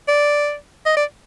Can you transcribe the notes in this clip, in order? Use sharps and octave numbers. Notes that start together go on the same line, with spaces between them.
D5
D#5
D5